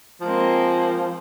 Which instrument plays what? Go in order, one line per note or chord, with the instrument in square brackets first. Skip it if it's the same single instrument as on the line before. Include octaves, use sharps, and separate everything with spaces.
[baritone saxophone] F3 [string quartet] G#3 A#3 C4